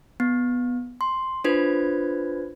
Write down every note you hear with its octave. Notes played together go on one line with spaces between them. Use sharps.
B3
C6
D4 F4 B4 C5 G#6